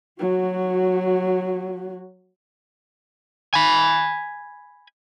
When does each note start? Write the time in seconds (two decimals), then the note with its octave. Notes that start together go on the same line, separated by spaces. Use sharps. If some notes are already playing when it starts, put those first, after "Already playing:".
0.19 F#3 F#4
3.54 G#5 B5